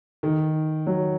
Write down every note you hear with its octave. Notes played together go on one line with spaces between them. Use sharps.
D#3
F#3